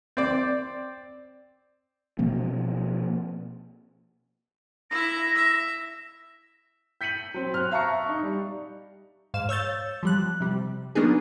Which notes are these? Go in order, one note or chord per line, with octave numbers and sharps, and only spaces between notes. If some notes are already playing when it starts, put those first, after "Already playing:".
C4 D5
B2 F3 A#3 C4
E4 E5 A#6
E5
G6 B6 C#7 D#7 F#7
F#3 C4
F6 F#6
E5 F5 A5 A#5 C#6 C#7
D#4 C#6
G3
G#2 F5 E7
C#5 E6 G6 A6
F3 G3 F#6
C3 G3
F#3 A#3 B3 D4 D#4 G#4